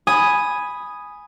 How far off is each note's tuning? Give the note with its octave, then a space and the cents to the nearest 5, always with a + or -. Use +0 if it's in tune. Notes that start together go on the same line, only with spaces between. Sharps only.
G#5 +0 B5 +0 D#6 +0